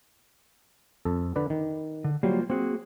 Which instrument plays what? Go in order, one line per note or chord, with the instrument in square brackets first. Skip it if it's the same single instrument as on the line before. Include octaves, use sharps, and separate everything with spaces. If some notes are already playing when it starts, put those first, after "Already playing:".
[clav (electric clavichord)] F2 A4
D3 B4 D5
D#3
[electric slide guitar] D3
[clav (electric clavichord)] F#3 G3 [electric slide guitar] A#3 F4 C5
[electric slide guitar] A#3 F#4 G#4 [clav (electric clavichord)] C4